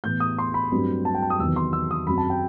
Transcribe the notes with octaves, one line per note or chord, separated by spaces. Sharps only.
A2 E3 B3 G6
D#6
C6
B5
G2 F#3 A3 C4
A5
G5
A5
D#6
E2 C3 D#3 F#3 B3 E6
C6
E6
D#6
F#2 F#3 C4 B5
A5
G5